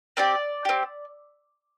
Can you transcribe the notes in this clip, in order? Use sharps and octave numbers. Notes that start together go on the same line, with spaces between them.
C4 G4 D5
C4 G4